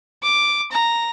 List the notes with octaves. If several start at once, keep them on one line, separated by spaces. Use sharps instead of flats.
D6
A#5